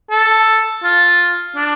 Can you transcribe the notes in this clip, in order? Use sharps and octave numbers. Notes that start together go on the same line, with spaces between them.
A4
F4
D4